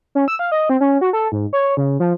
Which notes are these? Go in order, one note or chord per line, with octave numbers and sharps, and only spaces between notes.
C#4
E6
F5
D#5
C4
C#4
F#4
A4
G#2
C#5
C#3
F3